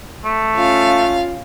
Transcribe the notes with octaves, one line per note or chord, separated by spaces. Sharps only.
A3
C#4 F4 F5